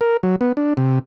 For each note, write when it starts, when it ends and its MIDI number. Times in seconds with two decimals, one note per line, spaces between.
0.01 0.17 70
0.23 0.36 54
0.41 0.52 59
0.57 0.73 62
0.77 0.99 48